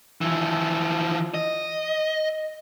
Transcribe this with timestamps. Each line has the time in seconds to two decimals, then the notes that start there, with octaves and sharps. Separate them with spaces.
0.21 E3 F3
1.34 D#5